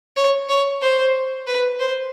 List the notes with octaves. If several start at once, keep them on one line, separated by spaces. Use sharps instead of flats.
C#5
C#5
C5
B4
C5